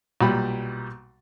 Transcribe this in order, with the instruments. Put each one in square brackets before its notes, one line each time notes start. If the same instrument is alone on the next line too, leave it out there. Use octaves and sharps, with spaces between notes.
[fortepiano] B1 A#2 G3 B5